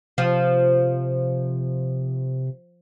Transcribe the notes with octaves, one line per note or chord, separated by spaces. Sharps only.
C3 F3